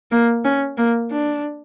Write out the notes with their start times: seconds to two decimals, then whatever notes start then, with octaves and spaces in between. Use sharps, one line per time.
0.11 A#3
0.45 C#4
0.78 A#3
1.11 D4